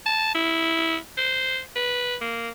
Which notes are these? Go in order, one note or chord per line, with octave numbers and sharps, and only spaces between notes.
A5
E4
C5
B4
A#3